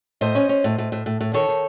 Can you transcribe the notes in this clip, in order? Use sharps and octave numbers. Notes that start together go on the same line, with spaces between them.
A2 C5 D#5
C#4
C#4
A2
A2
A2
A2
A2
D#3 A4 C#5
D#3